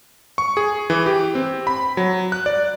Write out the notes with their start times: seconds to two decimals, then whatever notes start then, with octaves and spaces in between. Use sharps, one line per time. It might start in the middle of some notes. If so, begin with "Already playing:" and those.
0.38 C#6
0.57 G#4
0.90 E3
1.06 G4
1.35 C4
1.67 B5
1.97 F#3
2.32 F#6
2.46 D5